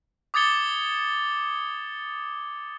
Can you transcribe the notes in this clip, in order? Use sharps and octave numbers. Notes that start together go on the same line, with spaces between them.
D6 D#6 G#6 A6 C#7 G7